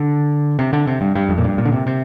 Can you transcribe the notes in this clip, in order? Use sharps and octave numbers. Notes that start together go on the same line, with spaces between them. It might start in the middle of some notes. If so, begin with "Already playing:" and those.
Already playing: D3
C3
D3
C3
G2
G2
F2
A#2
G2
A#2
D3
C3
C3